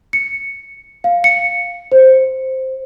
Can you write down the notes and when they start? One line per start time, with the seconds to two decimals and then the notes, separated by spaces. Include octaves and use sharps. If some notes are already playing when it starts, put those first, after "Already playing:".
0.13 C#7
1.04 F5
1.24 C#7
1.92 C5